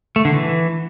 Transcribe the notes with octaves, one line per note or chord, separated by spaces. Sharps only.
A3
D3
E3